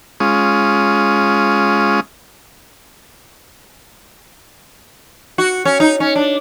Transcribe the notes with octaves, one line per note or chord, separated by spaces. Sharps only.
G#3 C#4 F4 D#6
F#4
C#4
D#4
C#4
D4